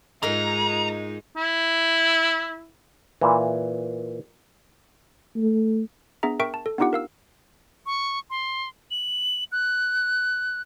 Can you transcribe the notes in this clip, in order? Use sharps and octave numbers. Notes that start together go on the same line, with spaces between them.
G#2 G#3 D#4 F4 A#4 A#5
E4
A#2 E3
A3
B3 D4 G#4 E5 A#5
A#4 E5 G5 C#6 D7
A5
A4
B3 D4 D#4 F4 G4 F#5
A#4 F5 E6
C#6
C6
F#7
F#6